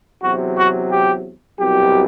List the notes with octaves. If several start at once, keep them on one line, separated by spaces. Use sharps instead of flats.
E2 C3 F#3 F#4
F#4
G4
C2 B2 F#3 G4